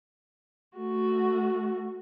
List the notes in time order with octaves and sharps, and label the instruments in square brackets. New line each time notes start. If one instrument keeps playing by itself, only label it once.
[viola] A3 F#4